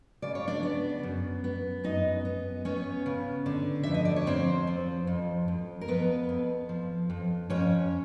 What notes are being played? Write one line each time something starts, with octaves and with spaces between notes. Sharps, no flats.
C#3 D5
C#5
D4 D5
B3
F#2
B3
F#2 D#4 D#5
B3
B3 C#4 C#5
C#3
D3
F2 E5
D#5
D5
C#5
F2 C4 C5
F3
F2
F2
A#4
F2 B3 B4
F2
F3
F2
F2 C#4 C#5